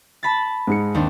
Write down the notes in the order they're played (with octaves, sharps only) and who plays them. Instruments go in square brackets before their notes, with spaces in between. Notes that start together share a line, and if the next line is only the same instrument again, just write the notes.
[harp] A5 B5 A6
[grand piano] G#2 G#3 C#7
[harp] D#2 C4 D4